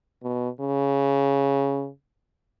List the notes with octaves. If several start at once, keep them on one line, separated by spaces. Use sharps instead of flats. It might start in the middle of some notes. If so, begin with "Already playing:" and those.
B2
C#3